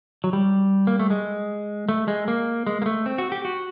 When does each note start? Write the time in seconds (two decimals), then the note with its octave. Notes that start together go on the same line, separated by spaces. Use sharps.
0.24 F#3
0.33 G3
0.87 A#3
1.00 A3
1.10 G#3
1.89 A3
2.08 G#3
2.28 A#3
2.67 G#3
2.82 A#3
2.86 A3
3.06 C4
3.18 F#4
3.32 G4
3.45 F#4